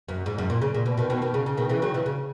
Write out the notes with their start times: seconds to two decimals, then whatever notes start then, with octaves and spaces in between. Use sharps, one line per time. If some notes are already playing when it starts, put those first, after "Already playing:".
0.08 F#2
0.26 G#2
0.38 F#2
0.50 A#2
0.62 C#3
0.74 A#2
0.86 B2
0.97 B2 D#3
1.10 B2 D#3
1.22 B2 D#3
1.34 C#3
1.46 C#3
1.57 B2 D#3
1.69 C#3 E3
1.82 D#3 F#3
1.94 C#3 E3
2.06 C#3